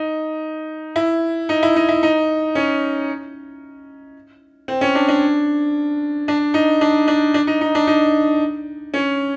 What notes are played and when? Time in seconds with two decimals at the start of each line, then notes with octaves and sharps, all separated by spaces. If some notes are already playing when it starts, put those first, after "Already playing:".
Already playing: D#4
0.96 E4
1.49 D#4
1.63 E4
1.76 D#4
1.89 E4
2.03 D#4
2.55 C#4
4.68 C4
4.81 C#4
4.95 D4
5.08 D4
6.28 D4
6.54 D#4
6.81 D4
7.08 D4
7.34 D4
7.47 D#4
7.61 D#4
7.75 D4
7.87 D#4
8.94 C#4